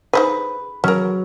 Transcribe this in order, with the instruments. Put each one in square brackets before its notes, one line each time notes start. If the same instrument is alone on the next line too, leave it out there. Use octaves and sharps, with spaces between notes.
[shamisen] D#4 C5 G#5 [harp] B4
[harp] F#3 [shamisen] C#4 A#4